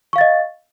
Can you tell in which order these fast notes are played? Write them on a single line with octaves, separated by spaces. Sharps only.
C#6 F5 A6 D#5